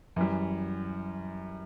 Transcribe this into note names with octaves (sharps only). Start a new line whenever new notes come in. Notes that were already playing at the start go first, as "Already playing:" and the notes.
F#2 E3 G3